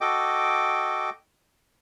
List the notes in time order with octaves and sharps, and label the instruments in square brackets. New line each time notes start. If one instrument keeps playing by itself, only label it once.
[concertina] F#4 A4 D#5 G5 D6